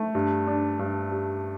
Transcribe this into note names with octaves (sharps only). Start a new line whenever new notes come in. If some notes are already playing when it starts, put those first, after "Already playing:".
Already playing: A3
G2
D4
G2
G3